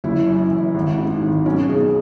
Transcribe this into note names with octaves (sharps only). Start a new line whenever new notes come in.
F#1 E4
F#2
E3
G#1
G#2
G#1
B1 C#4
B2 G#4